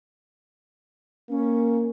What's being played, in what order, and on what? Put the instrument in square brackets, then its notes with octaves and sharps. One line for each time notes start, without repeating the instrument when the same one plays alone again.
[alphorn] A#3 [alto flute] C#4